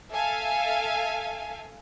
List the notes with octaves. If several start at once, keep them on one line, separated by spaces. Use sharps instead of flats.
A4 E5 F5 G#5